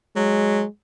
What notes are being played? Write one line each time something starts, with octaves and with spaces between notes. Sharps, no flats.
F#3 G#3